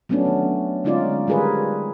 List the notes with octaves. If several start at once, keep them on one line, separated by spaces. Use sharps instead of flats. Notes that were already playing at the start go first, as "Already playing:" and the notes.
F#3 A3 B3 C#4 D4
D#3
D3 G#3 C#4 D#4 F4 D5
D#3 G3 F4 G#4 A#4 B4